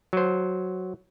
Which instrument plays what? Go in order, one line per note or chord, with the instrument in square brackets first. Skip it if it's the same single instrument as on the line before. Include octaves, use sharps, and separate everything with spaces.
[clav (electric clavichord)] F#3 C5